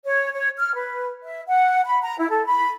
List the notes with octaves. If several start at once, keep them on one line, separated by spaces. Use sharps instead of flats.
C#5
C#5
F6
B4
E5
F#5
B5
A#5
E4
A4
B5